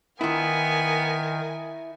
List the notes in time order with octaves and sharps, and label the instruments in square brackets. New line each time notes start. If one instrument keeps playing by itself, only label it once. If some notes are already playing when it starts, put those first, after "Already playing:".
[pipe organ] D#3 [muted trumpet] B3 [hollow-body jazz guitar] E4 F4 [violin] A#4 G#5